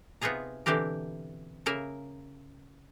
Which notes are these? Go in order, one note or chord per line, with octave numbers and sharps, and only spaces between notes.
C3 B3 D#4 F4 G#4 A#5
B2 D3 E3 C4 G4 A#4
C#3 A#3 A#4 E5